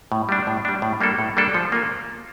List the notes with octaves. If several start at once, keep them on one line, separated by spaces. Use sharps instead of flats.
A2
G3 D4
A2
G3 D4
A2
G3 A#3 D4 A4
A2
G3 A#3 D4 A4
F3
A#3 F4